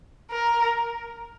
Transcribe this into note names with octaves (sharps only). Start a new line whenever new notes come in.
A#4